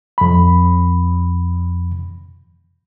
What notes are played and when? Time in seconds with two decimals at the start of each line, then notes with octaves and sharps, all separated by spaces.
0.18 F2 B5